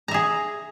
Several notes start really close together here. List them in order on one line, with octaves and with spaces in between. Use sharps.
A#5 E5 G#4